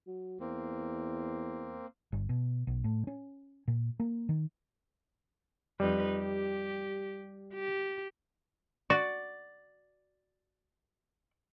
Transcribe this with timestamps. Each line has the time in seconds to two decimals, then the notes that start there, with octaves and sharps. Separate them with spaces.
0.07 F#3
0.40 E2 A#3 C4
2.12 G1
2.29 B2
2.67 B1
2.84 A2
3.07 C#4
3.68 A#2
4.00 A#3
4.29 D#3
5.80 F2 G3 D#4 B4
6.18 G4
7.54 G4
8.90 F#4 D5